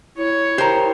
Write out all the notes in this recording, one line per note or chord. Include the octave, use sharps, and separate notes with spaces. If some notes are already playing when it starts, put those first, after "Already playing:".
E4 C#5
G4 A#4 C5 A#5